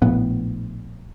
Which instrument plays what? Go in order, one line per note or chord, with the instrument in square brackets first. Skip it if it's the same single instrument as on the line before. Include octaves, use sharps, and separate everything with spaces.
[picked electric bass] A#1 A2 B3